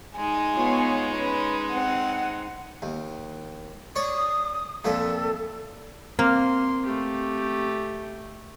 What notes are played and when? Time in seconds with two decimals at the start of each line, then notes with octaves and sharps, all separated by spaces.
0.17 G#3 D#4 G#5
0.56 B3 F4 C#5
1.16 C#4 B4
1.72 C4 F#5
2.82 D#2
3.96 C#5 D5 C#6 D#6
4.85 F2 A#2 A4 E5
6.19 A#3 C4 C6
6.86 A3 G4